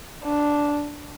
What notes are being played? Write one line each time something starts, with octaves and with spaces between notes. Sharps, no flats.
D4